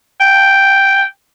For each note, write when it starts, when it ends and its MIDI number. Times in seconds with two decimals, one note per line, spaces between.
0.21 1.05 79